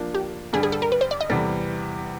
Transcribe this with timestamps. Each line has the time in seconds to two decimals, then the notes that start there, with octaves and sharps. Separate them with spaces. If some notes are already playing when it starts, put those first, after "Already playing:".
Already playing: F3 A#3 D4
0.14 G4
0.53 G2 D3 G3 G#4
0.63 G#4
0.72 A4
0.82 A#4
0.92 B4
1.01 C5
1.11 D5
1.21 D#5
1.30 E2 C3 E3 G3 A4